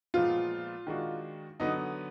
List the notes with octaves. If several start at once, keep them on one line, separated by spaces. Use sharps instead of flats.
A#2 F3 G#3 B3 F4
D#3 G#3 D4 F#4
D3 F#3 B3 D#4